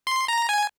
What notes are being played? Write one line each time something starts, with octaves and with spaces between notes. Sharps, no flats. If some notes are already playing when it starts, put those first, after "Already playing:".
C6
A#5
G#5